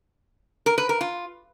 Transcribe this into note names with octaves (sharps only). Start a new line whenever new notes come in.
A#4
B4
A#4
F4